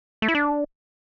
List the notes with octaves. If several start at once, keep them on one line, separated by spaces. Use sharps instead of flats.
A3
E4
D4